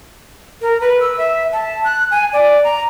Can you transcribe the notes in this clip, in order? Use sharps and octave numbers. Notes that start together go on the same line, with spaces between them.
A#4
B4
E6
E5
A5
F#6
G#5
D5
A#5